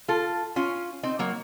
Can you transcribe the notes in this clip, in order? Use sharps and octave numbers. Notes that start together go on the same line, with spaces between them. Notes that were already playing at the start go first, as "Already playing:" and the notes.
F4 A4
C#4 F4
C4 D#4
F#3 A#3